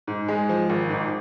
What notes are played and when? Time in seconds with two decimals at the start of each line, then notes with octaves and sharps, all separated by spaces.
0.07 G#2
0.28 G#3
0.49 F3
0.70 G#1
0.90 G#2